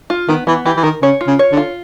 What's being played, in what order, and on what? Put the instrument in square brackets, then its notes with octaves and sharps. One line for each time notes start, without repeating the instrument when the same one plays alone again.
[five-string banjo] F4
[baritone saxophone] D#3 [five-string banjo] B3
[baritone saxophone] E3 [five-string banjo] B3
[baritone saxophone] E3 [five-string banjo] G4
[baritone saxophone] E3
[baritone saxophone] D#3 [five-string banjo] A#4
[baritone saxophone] C#3 [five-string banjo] C#5
[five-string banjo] F4
[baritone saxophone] C#3
[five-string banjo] C#5
[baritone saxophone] D3
[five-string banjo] F4